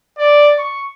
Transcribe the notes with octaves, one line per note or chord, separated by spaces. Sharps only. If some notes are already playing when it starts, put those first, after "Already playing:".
D5
C#6